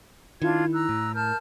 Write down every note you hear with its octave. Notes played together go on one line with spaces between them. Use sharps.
D#3 D4 E4 F4 G#6
A#5 E6 F#6
A2
A#4 A5 F6 G6